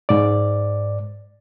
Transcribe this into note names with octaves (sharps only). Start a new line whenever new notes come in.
G#2 D5